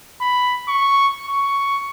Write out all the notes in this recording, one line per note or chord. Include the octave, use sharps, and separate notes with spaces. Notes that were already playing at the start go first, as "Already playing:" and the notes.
B5
C#6
C#6